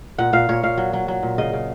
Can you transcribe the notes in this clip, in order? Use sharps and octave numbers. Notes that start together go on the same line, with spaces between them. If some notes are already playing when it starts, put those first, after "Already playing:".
A#2 F#5
A#2 F5
A#2 C#5
A#2 F5
F#3
F#3
F#3
A#2
C#3 D#5
C#3